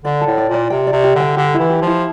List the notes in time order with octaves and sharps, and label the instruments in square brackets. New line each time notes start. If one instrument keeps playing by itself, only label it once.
[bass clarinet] D3 [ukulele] D5
[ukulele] A4
[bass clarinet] A2
[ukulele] D5
[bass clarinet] A#2 [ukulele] D5
[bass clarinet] C3 [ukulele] G5
[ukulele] D5
[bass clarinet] C3
[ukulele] G4
[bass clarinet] D3 [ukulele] G5
[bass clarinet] D3 [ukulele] G4
[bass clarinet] E3 [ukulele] E4
[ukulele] G4
[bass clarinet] F3
[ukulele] E4